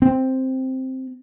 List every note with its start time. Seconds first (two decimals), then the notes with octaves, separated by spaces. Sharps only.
0.02 C4